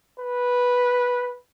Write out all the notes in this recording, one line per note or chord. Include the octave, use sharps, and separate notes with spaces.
B4